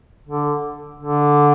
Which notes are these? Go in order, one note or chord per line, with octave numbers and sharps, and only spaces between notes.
D3
D3